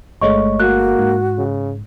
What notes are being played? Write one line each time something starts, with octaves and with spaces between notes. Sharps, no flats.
G1 G#3 A3 C#5 D#5 C#6
A#3 F#4 F#6
G#2
C#3